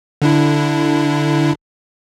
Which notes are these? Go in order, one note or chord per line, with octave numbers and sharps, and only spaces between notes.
D3 D4 E4